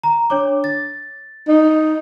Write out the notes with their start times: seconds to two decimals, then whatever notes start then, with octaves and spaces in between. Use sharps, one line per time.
0.03 A#5
0.30 D4 C#5 D6
0.64 A6
1.48 D#4